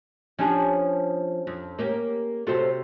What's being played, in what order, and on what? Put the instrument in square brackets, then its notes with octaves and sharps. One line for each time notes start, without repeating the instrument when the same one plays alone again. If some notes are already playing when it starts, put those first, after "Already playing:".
[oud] F3 D4 G4 [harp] C#4 G#5
[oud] F2
A#3 C#4 G4
[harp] C3 F#4 [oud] F4 A4 C5